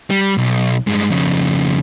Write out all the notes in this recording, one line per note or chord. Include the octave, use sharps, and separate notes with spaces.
G3
B1
G2 G#3
F2 C#3